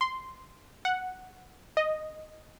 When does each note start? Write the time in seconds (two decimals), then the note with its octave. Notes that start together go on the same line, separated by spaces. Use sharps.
0.01 C6
0.85 F#5
1.77 D#5